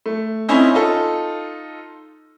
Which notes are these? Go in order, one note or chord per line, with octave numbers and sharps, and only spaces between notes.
A3
C4 C#4 D#4 E4
D#4 F4 A4